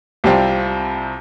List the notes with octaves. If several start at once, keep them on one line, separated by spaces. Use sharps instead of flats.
C2 C3 G3 C4 F4